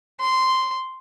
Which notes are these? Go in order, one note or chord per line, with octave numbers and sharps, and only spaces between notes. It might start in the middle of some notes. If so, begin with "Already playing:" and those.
C6